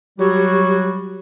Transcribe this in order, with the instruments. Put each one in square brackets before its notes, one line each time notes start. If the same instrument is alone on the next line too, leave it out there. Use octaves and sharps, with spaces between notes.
[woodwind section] F#3 G3 F#4 [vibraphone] G4